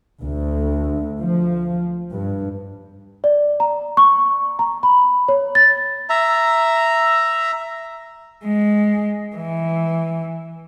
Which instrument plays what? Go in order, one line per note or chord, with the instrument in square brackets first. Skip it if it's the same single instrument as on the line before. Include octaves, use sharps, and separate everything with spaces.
[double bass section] D2
F3
G2
[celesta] D5
A#5
C#6
A#5
B5
C#5
A6
[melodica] E5 A#5
[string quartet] G#3
E3